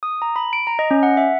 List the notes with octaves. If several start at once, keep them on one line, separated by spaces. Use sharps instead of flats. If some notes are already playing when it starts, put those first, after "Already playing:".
D#6
A#5
B5
D7
A#5
D#5
C#4
F#5
E5